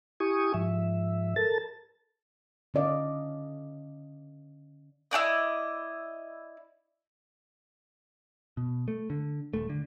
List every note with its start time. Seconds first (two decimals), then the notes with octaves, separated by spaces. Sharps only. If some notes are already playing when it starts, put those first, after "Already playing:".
0.20 E4 G4 G#5 C#6 D#6
0.54 G#2 F3 E5
1.36 A4 A#4 A5 A6
2.74 D3 C#4 D5 D#5 F5
5.11 E4 G4 D5 D#5
8.57 B2
8.88 A3
9.10 D3
9.54 D#1 A3
9.69 D3